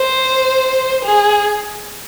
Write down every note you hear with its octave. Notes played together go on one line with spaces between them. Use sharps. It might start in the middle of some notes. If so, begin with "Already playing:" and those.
Already playing: C5
G#4